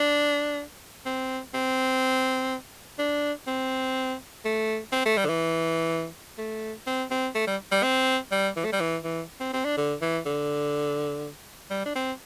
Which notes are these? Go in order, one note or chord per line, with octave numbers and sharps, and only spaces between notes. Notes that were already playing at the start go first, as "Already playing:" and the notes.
Already playing: D4
C4
C4
D4
C4
A3
C4
A3
G3
D3
E3
A3
C4
C4
A3
G3
G3
C4
G3
E3
A3
G3
E3
E3
C4
C4
D4
D3
E3
D3
G3
D4
C4